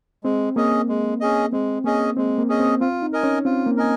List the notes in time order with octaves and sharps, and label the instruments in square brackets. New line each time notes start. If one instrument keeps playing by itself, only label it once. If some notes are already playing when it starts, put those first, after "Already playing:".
[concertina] G#3 [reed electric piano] C4
[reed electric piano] A#3 [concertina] C#4 G#4 D#5
[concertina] G#3
C#4 G#4 D#5
[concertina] G#3 [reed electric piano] C4
[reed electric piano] A#3 [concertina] C#4 G#4 D#5
[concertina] G#3 [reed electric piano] C4
[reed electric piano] A#3
[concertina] C#4 G#4 D#5
[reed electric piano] C4
[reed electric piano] C4 [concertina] F4
[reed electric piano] D#4
[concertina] A#4 D#5 G#5
[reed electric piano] C#4
[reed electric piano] C4 [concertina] F4
[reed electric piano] A#3
[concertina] A#4 D#5 G#5